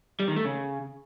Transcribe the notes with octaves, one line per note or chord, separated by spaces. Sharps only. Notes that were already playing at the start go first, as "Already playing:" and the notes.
G3
D#3
A3
C#3